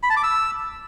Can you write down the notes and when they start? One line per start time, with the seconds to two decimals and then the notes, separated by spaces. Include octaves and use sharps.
0.03 B5
0.10 A5
0.17 D6
0.23 E6